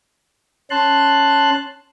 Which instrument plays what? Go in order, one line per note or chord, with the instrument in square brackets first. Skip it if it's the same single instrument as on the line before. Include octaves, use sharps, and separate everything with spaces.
[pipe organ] C#4 A5 C6 F#6